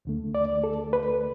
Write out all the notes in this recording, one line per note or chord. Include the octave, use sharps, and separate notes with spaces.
D2 D3 A3
D5
A4
B4